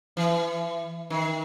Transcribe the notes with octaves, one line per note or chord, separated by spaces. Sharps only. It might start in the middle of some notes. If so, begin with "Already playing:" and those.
E3
D#3